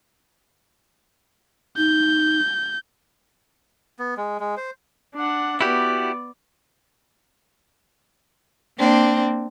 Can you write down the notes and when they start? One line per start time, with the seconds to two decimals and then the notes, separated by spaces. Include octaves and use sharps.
1.77 D#4 G6
3.99 B3
4.18 G#3
4.40 G#3
4.57 C5
5.15 D4 F#5
5.61 B3 E4 F#4 G4 D5
8.77 A#3 C4 D4